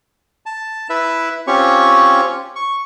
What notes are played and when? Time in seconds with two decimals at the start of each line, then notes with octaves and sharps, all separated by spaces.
0.46 A5
0.90 E4 B4 E5
1.47 C4 C#4 F4 G4 C#5 C#6
2.56 C#6